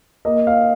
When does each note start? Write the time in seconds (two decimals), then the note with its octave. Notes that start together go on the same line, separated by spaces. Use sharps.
0.25 A#3 D#5
0.47 F5